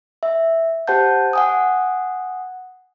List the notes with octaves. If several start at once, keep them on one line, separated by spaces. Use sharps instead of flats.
E5
G4 C5 F#5 A5 G6
F#5 G#5 D#6